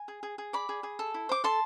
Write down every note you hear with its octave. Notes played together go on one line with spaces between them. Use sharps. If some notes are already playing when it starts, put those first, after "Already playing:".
Already playing: G#5
G#4
G#4
G#4
D5 B5 D6
G#4
G#4
A4
E4
C5 D6
A4 A5 C6